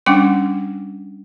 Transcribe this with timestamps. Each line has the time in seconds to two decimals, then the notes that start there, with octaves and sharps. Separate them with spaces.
0.06 G3 C#4 D4 G5 D6